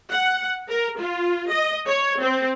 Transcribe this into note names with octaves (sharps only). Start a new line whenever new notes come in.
F#5
A#4
F4
D#5
C#5
C4